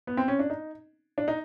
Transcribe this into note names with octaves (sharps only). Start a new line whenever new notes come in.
B3
C4
C#4
D4
D#4
D4
D#4